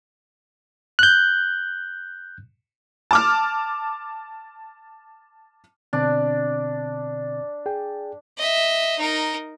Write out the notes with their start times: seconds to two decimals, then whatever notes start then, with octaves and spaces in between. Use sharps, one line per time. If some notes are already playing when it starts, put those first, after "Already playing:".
0.99 F#6 G6
3.11 A5 D6 F6
5.93 B2 D3 C4 D4
7.66 G#4 G5
8.37 D#5 E5
8.99 D#4 A#4